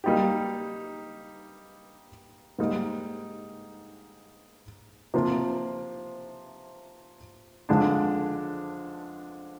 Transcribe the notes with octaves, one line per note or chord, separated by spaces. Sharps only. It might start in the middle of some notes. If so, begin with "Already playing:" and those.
G3 A#3 D#4 G4
G#2 G3 A#3 D#4
C3 F3 A#3 F4 C5
F2 D3 G#3 D4